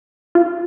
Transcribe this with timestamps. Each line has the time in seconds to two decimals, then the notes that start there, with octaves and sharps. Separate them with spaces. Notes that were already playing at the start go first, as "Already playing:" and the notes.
0.35 F4